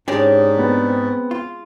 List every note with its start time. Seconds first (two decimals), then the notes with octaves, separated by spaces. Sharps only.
0.08 G#2 G#3 C#4 D4 G4 D5
0.59 B3 C4
1.31 F4